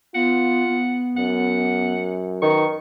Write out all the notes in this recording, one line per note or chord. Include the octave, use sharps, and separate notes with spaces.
B3 F4 F#5
B3
F#2 F#5
D#3 B4 C#6